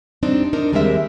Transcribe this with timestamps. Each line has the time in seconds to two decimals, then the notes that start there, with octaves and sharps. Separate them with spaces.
0.23 G3 C4 D4 D#4
0.53 D4 D#4 A#4
0.72 D#2 G3 G#3 C4 A#4 E5